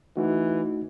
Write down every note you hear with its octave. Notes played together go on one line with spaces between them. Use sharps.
E3 A3 D#4 F#4